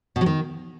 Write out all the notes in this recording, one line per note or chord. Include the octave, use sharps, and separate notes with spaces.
B2
F#3
D#3